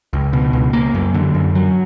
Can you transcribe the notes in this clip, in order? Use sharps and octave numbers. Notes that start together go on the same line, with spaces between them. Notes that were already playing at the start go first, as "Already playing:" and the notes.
C#2
B2
C#2
A#3
F#2
D3
F#2
F#3